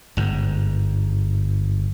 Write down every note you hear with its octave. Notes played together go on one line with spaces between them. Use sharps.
G1 G#2